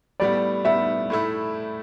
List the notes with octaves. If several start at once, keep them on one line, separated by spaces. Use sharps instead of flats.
A2 G3 B3 D5
A2 G3 B3 E5
A2 A3 E4